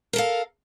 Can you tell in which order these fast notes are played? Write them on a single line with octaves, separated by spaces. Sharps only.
A#4 A4 F5